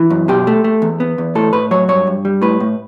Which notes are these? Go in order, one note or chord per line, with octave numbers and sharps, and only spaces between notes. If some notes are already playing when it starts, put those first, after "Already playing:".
Already playing: E3
F#2
B2 G4
A3
A3
E2
B3
E2
A2 A4
A2 B4
F#3 C#5
G2 C#5
G2
G3
A2 B4
A2